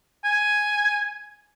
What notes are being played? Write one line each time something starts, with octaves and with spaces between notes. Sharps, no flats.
G#5